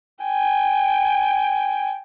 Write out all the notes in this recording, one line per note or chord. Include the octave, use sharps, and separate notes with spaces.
G5 G#5